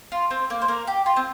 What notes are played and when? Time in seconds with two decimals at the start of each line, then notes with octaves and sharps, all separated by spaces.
0.12 F4
0.31 C4
0.50 A#3
0.62 C5
0.68 A#3 A#4
0.87 G4
1.06 F4
1.16 C4